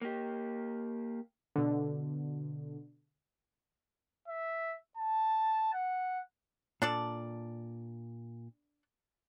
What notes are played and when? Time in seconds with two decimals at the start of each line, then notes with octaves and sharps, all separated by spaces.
0.02 A#3 G4
1.56 B2 D3
4.28 E5
4.97 A5
5.73 F#5
6.82 A#2 D4 A4 D5